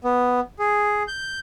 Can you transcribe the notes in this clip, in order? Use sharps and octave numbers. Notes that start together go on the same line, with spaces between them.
B3
G#4
G6